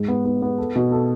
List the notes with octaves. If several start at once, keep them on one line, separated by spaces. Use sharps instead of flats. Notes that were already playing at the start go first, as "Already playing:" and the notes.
Already playing: G#2
B3
B3
B3
A4
B2
A4